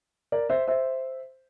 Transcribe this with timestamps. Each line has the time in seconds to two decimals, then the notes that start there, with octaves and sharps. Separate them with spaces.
0.32 A#4 D5
0.49 C5 E5
0.68 C5 E5